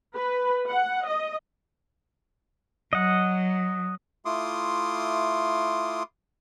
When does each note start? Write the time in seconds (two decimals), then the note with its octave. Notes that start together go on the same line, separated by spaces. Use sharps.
0.16 B4
0.68 F#5
1.07 D#5
2.93 F#3 D#5 F#5
4.25 A3 E4 F4 C6 D6 D#6